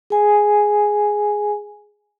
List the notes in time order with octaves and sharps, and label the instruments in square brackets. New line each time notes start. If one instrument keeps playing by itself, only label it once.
[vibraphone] G#4 G#5